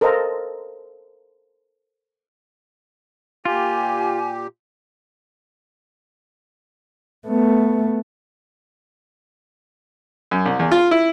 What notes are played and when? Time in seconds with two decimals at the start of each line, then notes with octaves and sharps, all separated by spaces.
0.01 A4 A#4 C5 D#5 F5 A#5
3.45 A#2 F4 G4 G#5
7.28 A3 B3
10.31 F#2
10.46 C2
10.59 E2
10.71 F4
10.91 E4